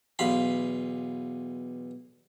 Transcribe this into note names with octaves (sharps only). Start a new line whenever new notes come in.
B1 E2 F5 B5 C6